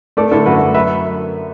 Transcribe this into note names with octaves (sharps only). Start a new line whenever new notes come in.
A3 A4 D5
D3 E4 A4
F#2 F#4 B4
F#2
B4 E5